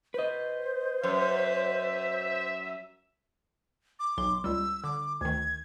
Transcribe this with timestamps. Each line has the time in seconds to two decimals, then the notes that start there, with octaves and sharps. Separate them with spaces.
0.14 B4 C5 D#5
1.03 F#2 E5
3.99 D6
4.17 B1 C6
4.44 C#2 G3 E6
4.84 D3 D6
5.21 D2 D#3 G#6